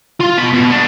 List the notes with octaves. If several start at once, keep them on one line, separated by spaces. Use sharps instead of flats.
F4
B2 B5
B2
B3 D4